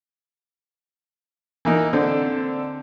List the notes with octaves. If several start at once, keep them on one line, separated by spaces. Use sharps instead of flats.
E3 A#3 D#4
D3 C4 D4 A4